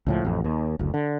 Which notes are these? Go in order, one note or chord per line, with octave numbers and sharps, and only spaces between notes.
C#2 A2 F3
A1 F2
D#2
F#1 D2
D3